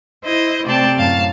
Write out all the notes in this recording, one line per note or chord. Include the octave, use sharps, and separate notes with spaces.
E4 C5 D#5
C3 A3 C4 D5 G5 A5
F#2 A2 F5 A5